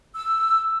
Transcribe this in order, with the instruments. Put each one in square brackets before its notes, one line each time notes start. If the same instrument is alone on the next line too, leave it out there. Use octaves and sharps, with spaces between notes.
[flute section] E6